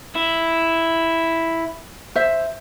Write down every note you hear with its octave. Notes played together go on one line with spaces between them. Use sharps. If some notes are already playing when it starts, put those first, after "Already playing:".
E4
C5 E5